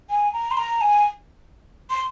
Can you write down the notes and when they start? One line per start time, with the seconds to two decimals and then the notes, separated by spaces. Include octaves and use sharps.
0.10 G#5
0.33 A#5
0.51 C6
0.57 A#5
0.81 G#5
1.90 C6